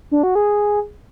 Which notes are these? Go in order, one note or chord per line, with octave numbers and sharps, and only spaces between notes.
D4
F#4
G#4